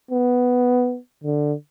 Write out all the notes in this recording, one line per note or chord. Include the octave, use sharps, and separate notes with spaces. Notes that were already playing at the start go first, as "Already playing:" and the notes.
B3
D3